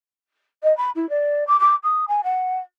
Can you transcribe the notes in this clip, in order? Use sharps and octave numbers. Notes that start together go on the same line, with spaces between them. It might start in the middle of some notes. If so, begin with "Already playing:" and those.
D#5
B5
E4
D5
D6
D6
D#6
G#5
F#5